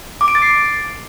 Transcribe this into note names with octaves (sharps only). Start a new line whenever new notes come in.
D6
D7
A6
C7